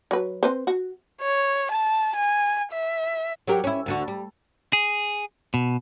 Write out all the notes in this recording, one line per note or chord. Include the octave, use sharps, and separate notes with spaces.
F#3 B4
C4 B4 C5
F#4
C#5
A5
G#5
E5
F#3 G4 A#4
C#4 E4
D2 D3 F#4
G3
G#4
B2